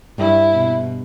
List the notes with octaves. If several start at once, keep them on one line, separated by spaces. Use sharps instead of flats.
G2 E4
B2